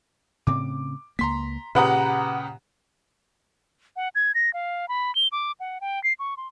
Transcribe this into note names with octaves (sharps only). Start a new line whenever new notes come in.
A2 C#3 C4 D6
C#2 A#3 A#5 C6 B6
A#2 C#3 G4 B4 F#5 A#5 D#6
F#5
G#6
A#6
F5
B5
G7
D6
F#5
G5
C7
C#6
C6